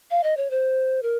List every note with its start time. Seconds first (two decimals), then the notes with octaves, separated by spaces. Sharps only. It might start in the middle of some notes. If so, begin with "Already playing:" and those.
0.11 F5
0.23 D#5
0.37 C#5
0.51 C5
1.03 A#4